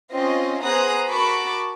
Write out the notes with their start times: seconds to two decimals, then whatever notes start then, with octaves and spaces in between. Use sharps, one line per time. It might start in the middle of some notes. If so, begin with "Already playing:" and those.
0.13 C4 C#4 F4 D#5
0.64 B3 G#4 C5 A#5 D#6 F#6
1.09 F#4 A#4 A5 B5 C#6 D6